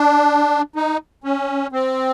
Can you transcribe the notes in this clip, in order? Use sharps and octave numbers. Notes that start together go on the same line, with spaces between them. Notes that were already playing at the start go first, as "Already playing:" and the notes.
Already playing: D4
D#4
C#4
C4